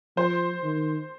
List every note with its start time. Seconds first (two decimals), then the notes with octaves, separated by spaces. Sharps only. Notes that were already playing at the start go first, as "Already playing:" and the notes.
0.17 F3 C5
0.63 D#3